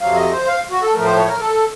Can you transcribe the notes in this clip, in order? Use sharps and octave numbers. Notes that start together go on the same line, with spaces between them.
F2 C3 F#3 F5
D#5
C5
F5
F#4
A4
A2 F3 A3 A#4
C5
C#5
A#4
A4